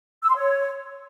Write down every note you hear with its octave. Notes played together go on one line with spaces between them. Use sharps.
E6
C6
C#5